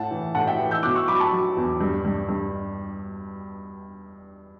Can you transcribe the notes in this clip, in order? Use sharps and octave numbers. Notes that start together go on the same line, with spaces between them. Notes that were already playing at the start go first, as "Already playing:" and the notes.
Already playing: A2 F#5 A5
E3
A2 F#5 A5
E5 G5
E3
E6 G6
B2 D6 F#6
C#6 E6
F#3 B5 D6
A5 C#6
F#3
E2
G2
G2
G2